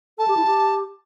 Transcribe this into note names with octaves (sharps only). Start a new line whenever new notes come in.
A4 A5
G4
E4
G4